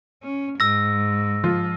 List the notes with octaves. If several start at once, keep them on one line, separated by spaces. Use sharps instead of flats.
C#4
G#2 E6 A#6
F3 F4